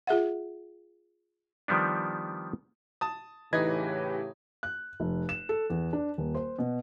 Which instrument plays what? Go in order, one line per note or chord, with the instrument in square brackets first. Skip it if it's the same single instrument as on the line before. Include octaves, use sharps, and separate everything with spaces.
[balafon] F4 G#4 E5 F#5
[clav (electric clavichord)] D#3 F3 G3 B3 D4
[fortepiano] A5 D#6
[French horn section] A2 C#3 G4 [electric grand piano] E3 B4 G#6 [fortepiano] D#4 D#5
[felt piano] F#6
F1
E7
A4
E2
D4
D#1
C5
B2